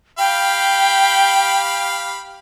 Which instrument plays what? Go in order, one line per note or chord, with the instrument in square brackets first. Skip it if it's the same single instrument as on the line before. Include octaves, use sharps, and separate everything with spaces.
[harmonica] G4 F5 B5 [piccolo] G5